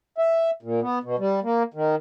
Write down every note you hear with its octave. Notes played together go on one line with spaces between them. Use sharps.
E5
A#2
B3
B2
G3
A#3
D#3